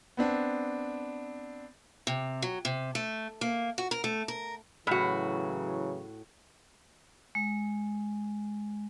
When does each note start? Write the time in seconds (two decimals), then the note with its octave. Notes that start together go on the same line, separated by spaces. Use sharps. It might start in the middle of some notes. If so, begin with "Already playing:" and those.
0.17 B3 C4 D4
2.07 C3
2.42 F#3
2.65 C3
2.95 A3
3.41 A#3
3.78 F#4
3.91 A#4
4.04 A3
4.28 A#4
4.87 A2 C#3 E3 F#3 F#4
7.35 G#3